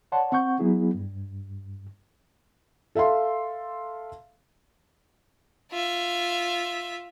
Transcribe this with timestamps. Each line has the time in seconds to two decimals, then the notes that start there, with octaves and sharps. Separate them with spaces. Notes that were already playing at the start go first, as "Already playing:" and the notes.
0.12 C#5 D5 F#5 A5 C6
0.32 C4 F#5 C#6 G6
0.59 F#3 B3 E4 G#4
0.94 G2
2.95 A4 E5 F5 C6
5.71 F4 E5